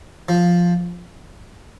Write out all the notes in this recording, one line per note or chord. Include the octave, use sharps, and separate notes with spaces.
F3